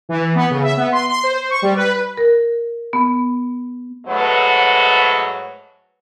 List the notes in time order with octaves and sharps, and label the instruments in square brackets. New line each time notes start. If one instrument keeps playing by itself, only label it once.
[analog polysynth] E3
B3
C#3
E5
B3
C6
C6
C5
C#6
G3
B4
[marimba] A#4
B3
[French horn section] G#2 F#3 A3 B4